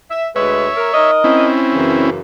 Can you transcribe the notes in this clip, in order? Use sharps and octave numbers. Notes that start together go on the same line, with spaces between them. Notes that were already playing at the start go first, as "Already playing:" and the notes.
E5
D2 G#3 B4 C#5 E5
A#4
D#4 A#4 D#5
C4 C#4 E4
F#2 C#3 E3